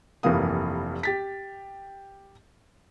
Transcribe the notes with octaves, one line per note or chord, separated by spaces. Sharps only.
F1 G2 E3 A#3 F5 D#6
G4 A6 B6